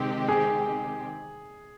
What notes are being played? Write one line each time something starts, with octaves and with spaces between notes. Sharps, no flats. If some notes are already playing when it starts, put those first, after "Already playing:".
Already playing: C3 D#3 G#3 C4 G4
G#4